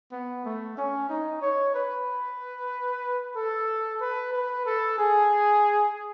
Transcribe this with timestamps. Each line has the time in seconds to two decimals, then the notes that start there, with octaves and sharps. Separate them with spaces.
0.12 B3
0.45 A3
0.78 C#4
1.09 D#4
1.42 C#5
1.74 B4
3.36 A4
4.01 B4
4.33 B4
4.66 A4
4.98 G#4